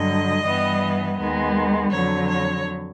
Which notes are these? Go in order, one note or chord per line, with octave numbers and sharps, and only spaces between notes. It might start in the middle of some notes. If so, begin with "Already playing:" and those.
Already playing: G2 D3 F#3 D#5
G2 E3 G3 B3
D#2 D#3 G#3 B3
F2 D3 F#3 C#5
C#5